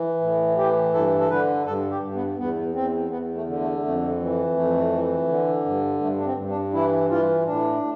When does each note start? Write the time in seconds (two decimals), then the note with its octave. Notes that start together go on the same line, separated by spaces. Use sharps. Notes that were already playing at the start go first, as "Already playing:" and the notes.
Already playing: E3
0.21 A2
0.57 E3 G4
0.93 G2 A4
1.20 A4
1.30 D3 B4
1.66 G2 A4
1.90 G4
2.02 G2
2.15 B3
2.38 E2 B3
2.75 E2 C4
3.10 E2 B3
3.35 A3
3.47 D3
3.60 A3
3.83 F2 A3
4.20 E3
4.56 F2 A3
4.92 E3
5.28 D3
5.65 G2
6.01 G2 A3
6.19 D4
6.25 C4
6.37 G2
6.49 D4
6.73 E3 E4
7.10 E3 F4
7.46 A2 D4